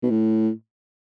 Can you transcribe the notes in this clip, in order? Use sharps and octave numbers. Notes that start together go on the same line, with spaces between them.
B2
A2